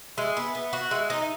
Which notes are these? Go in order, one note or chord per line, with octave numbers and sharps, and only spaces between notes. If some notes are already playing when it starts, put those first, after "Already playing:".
G#3 E5
B3
B3
F#4
G#3 E5
D#4